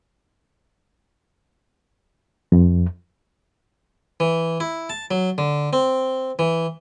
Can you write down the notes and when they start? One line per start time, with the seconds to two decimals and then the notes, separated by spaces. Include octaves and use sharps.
2.52 F2
4.20 E3
4.60 E4
4.89 A5
5.11 F#3
5.38 D3
5.73 C4
6.39 E3